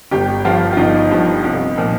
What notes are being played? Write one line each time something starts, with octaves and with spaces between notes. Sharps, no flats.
G1 G4
G2 F3 F4
F4
G1 D#4
G2 F3
C2
A#2 F3